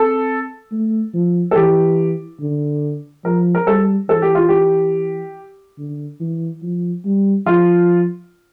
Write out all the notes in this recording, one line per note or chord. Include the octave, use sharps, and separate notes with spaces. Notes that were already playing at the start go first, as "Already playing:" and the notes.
Already playing: C4 A4
A3
F3
A4
E3 G4
D3
F3 A#4
A#4
G3 A4
E3 A4
G4
F4
G4
D3
E3
F3
G3
F3 F4